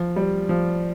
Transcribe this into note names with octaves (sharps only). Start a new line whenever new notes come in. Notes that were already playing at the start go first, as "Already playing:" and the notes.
Already playing: F3
G3
F3